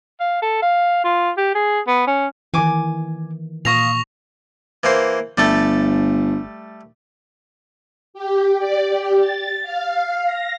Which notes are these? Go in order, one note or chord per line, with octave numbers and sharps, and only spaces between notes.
F5
A4
F5
F4
G4
G#4
B3
C#4
D#3 E3 G#5 D6
A#2 F5 C#6 D#6 A#6 F7
E3 A#3 C5
G1 G3 A3 A4
G4
D5
G4
A6
F5
A#6